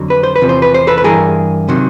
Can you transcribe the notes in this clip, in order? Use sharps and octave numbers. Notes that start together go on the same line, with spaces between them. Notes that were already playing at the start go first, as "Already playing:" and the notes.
Already playing: F2 D3 F#3
B4
C5
B4
E2 C3 F3
C5
B4
C5
A4 B4
B4
G2 E3 G#4 A#4
C3 D#3 F#3